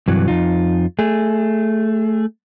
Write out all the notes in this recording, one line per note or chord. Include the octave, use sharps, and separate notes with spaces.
G2 C3 E3 F#3
F2 C3 D#4 F4
A3 G#4